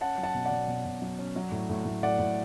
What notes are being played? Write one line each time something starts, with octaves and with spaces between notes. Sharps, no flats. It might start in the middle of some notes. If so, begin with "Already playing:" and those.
C#4 F#5 A5
F#3
F#5 A5
B2
D5 F#5
B2
B2
B2
F#3
C#4
F#3
A2
A2
A2
A2 D5 F#5
A2